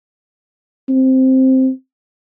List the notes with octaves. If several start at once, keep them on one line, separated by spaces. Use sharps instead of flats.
C4